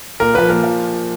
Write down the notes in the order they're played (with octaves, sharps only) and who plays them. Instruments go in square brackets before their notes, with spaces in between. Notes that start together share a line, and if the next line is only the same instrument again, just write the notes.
[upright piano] A#2 [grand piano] A#4
[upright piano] F3 A#3 [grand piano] B4
[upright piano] A#2 [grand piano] A#4
[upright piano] F3